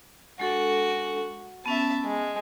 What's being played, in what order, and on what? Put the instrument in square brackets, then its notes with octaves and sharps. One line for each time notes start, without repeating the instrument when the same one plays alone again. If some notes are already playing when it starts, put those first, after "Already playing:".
[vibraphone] G#3 D4 A4 [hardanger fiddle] F#4
[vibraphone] B3 C#4 [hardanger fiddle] E5 A5
[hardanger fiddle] G#3